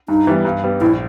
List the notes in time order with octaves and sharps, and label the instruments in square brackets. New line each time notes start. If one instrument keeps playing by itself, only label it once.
[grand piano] G2 [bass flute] D#4
[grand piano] E3 G3 B3
G2
G3 B3
[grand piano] A#1 [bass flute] E4